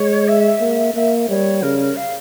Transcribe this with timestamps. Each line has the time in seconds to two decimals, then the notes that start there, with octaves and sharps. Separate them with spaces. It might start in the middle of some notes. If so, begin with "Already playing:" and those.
Already playing: G#3 C#5
0.27 E5
0.61 A#3
0.94 A#3 E5
1.28 G3 C#5
1.62 C#3 A#4
1.79 A#4
1.96 F5